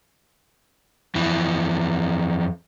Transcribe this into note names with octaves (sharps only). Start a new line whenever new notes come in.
F2 E3